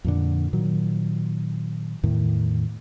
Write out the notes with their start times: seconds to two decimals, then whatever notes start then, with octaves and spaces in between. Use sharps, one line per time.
0.04 F2 A#2 D3
0.53 A#2 D#3 F#3
2.03 E2 A2 D#3